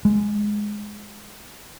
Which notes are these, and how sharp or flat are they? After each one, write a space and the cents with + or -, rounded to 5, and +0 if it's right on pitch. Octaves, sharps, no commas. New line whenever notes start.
G#3 +5